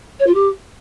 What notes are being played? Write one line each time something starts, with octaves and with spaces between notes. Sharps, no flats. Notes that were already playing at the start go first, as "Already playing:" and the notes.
C#5
F4
G4